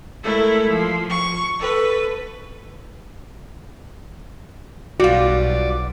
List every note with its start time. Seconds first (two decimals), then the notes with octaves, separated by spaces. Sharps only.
0.23 G#3 A3 E4 A4 A#4
0.67 F3
1.10 C#6
1.59 A4 B4
5.00 B1 G3 F4 F#4 D5